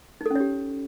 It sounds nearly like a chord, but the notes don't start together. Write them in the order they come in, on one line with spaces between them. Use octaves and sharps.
D#4 A4 C#4 C#5 G4